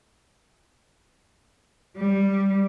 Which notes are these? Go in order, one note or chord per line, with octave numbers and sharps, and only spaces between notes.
G3